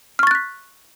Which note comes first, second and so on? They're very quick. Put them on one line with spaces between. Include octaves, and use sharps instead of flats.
F6 C#6 A6 F#6 B6